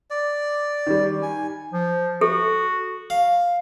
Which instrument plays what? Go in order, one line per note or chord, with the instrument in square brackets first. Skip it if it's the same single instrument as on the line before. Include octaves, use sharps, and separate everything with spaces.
[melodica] D5
[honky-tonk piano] D#3 G3
[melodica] G#5
[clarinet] F3
[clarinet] F#4 [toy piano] A4
[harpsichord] F5